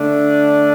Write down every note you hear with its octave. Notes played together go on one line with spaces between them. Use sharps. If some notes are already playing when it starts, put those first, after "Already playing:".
Already playing: D3 A3 D4